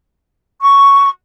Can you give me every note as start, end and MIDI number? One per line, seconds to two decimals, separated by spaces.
0.62 1.09 85